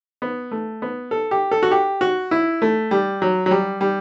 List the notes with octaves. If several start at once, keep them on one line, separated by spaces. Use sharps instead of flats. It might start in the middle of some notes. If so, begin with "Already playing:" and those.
B3
A3
B3
A4
G4
A4
F#4
G4
F#4
E4
A3
G3
F#3
F#3
G3
G3